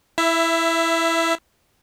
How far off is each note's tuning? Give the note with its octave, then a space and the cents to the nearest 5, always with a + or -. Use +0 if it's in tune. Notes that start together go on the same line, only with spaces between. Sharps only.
E4 +0 E5 +20